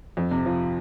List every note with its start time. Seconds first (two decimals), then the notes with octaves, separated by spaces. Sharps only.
0.17 F2
0.31 C3
0.46 F3